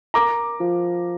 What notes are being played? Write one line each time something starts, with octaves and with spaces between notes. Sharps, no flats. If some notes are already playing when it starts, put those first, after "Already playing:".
A#4 A#5 D6
F3